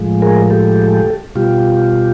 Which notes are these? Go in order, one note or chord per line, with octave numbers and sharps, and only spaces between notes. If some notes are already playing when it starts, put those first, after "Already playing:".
Already playing: A2 F3 G#3
G#4 A#4
G4 A4
B2 G3 F4 G4